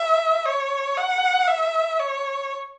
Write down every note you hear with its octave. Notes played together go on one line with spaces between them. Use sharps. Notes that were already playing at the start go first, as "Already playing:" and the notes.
Already playing: E5
C#5
F#5
E5
C#5